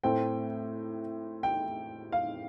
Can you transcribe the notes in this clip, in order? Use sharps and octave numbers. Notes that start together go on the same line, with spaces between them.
A2 A3 C4 G5
G5
F5